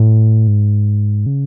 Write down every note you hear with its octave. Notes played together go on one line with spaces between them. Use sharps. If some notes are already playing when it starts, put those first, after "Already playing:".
Already playing: A2
G#2
C#3